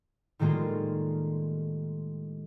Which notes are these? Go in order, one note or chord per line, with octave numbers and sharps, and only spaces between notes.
A2 D#3 G3 G#3 A#3 F4